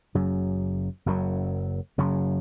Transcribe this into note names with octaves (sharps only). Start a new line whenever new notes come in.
F#1 F#2 C#3 F#3
F#1 F#2 C#3 F#3
F#1 F#2 C#3 F#3